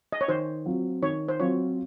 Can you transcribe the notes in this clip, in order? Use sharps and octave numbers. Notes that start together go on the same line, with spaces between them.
D#5
C#5
D#3 C5
F#3 C4 F4
D#3 C#5
C5
F#3 C4 F4 C#5